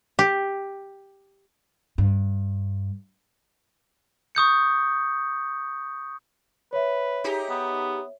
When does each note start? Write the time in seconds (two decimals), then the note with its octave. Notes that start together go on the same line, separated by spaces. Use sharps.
0.19 G4
1.98 G2
4.35 C#6 D#6 G6 C#7
6.73 B4 C#5 E5
7.24 D#4 G4 G#4
7.50 B3